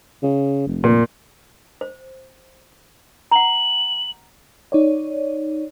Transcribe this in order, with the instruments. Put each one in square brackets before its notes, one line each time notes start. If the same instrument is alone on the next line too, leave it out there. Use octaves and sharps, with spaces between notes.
[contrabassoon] C#3
F1
[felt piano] A#2
[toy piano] C5
[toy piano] F#5 A#5 [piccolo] F#7
[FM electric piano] D#4 C#5 D5